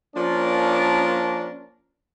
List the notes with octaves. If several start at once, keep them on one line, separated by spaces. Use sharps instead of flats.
F3 A#3 C#4 D4 A#4 D5